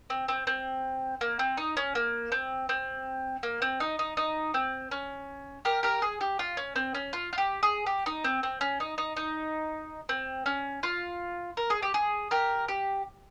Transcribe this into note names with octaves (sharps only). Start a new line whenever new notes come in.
C4
C4
C4
A#3
C4
D#4
C#4
A#3
C4
C4
A#3
C4
D#4
D#4
D#4
C4
C#4
G4 A#4
G4 A#4
G#4
G4
F4
C#4
C4
C#4
F4
F4
G4
G#4
G4
D#4
C4
C4
C#4
D#4
D#4
D#4
C4
C#4
F4
A#4
G#4
G4
G#4
G4 A#4
G4